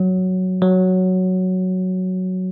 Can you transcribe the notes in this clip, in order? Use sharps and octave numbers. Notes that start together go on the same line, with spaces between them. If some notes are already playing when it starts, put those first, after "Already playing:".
Already playing: F#3
F#3